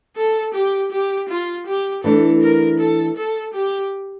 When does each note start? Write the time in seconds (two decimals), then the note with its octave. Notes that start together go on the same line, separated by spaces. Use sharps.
0.17 A4
0.54 G4
0.92 G4
1.29 F4
1.66 G4
2.04 E3 A3 D4 A4
2.42 A#4
2.79 A4
3.16 A4
3.54 G4